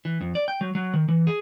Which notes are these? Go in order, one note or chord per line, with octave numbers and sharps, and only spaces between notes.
E3
F2
D5
G5
F#3
F#3
D#3
E3
G#4